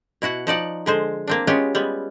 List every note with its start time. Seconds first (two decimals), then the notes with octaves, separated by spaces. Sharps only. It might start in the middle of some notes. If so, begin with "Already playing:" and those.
0.22 B2 E4 F#4 F#5
0.47 F3 D#4 D5 F#5
0.86 D3 G#3 C5
1.28 A#3 C4 D4
1.47 G#3 B3 C#4 F4 G4
1.75 G3 G#3 B3